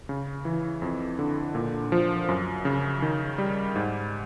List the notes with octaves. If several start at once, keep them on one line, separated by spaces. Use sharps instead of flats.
C#3
E3
F2
D3
A#2
F3
F#2
C#3
D#3
G3
G#2